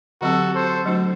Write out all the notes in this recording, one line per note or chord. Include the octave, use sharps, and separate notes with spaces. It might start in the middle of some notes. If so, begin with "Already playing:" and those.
D3 F#3 C4 F#4 G4 A4
A4 C5
F#3 A3 D4 F#4 C5